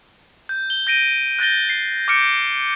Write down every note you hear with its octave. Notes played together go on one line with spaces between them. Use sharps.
G6
G7
G6 A#6 D7 D#7
F#6 G6 A6 A#6 G7
C7
D6 F6 G6 C#7 D7